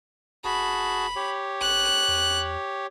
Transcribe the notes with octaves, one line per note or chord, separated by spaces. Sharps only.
F1 F#4 G#4 A5 B5
G4 C#5
G1 F#6
E2